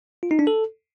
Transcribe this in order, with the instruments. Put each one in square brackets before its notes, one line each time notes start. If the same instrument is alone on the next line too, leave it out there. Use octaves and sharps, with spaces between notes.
[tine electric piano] F4
D#4
D4
A4